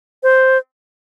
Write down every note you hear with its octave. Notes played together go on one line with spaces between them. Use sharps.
C5